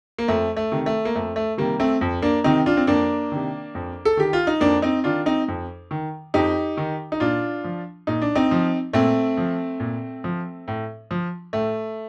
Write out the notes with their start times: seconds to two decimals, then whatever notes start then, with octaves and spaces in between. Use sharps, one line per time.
0.18 A#3
0.28 F2 A3
0.56 A3
0.72 C3 D#3
0.86 A3
1.05 A#3
1.15 F2 A3
1.36 A3
1.57 C3 D#3 G3 A#3
1.80 A3 C4
2.01 F2
2.22 A#3 D4
2.44 C3 D#3 C4 D#4
2.66 D4 F4
2.77 C4
2.87 F2 A#3 D4
3.32 C3 D#3
3.75 F2
4.05 A4
4.17 D#3 G4
4.33 F4
4.47 D#4
4.60 F2 A#3 D4
4.82 C4 D#4
5.04 D#3 D4 F4
5.26 C4 D#4
5.48 F2
5.91 D#3
6.34 F2 D#4 G4
6.77 D#3
7.12 D#4
7.20 A#2 D4 F4
7.64 F3
8.07 A#2 D#4
8.22 D4
8.35 C4 D#4
8.51 F3
8.93 A#2 A3 C4
9.37 F3
9.80 A#2
10.24 F3
10.68 A2
11.11 F3
11.53 A2 A3